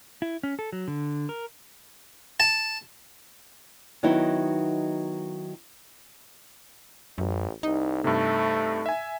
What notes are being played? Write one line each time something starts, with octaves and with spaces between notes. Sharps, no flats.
E4
C#4
A4
F#3
D3
A#4
A5
D#3 F#3 B3 D#4 E4
A1 F#2
C2 D#4
G2 C3 A3
E5 G#5